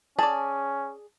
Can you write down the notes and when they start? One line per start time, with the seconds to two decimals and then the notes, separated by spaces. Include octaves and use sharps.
0.19 C#4 G#4 D5 A5